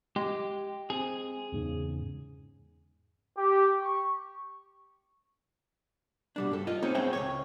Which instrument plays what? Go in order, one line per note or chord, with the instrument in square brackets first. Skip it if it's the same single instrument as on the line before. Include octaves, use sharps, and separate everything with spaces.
[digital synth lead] G#3 [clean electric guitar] G4
[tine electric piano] C4 [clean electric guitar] G#4
[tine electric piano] E2 G#2 C#3
[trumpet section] G4
C#6
[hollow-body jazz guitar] B2 G3 D4
G2 A4
F4 D#5
G#3 C4 C#4 D#4 A4
B3 C4 G#4 C#5 E5 G5
C#2 F#2 C#5